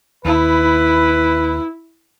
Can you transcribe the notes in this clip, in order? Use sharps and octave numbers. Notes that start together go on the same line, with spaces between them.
D#2 E4 B4